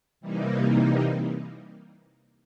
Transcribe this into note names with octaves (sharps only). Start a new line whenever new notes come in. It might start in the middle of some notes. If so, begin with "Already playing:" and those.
C3 E3 G3 A#3 D#4